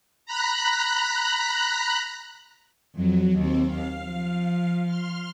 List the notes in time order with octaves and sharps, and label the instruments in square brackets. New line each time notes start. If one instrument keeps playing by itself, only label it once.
[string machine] A#5 B5 F#6
[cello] F2 [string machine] F#3
[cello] D#2 [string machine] C4
[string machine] F5
[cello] F3
[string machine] C6 F6